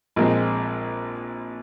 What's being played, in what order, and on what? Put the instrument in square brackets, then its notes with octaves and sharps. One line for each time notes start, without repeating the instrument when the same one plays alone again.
[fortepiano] A#1 A#2 G#3 C4